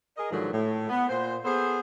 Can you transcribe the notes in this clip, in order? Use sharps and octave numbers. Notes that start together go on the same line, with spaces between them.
G#4 A#4 D#5
G#2 D3 D#3 F3 F#3
A2
B3
A#2 C5
B3 G#4 A4 C5